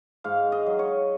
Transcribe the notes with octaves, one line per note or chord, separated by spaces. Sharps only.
G#2 F5
D#5
F#3
C#5